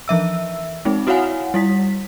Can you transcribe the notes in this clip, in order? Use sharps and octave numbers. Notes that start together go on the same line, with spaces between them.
E3 F3 E5 E6
G#3 C4 D#4
E4 F#4 C#5 F5 F#5 G#5
G3 E4 B6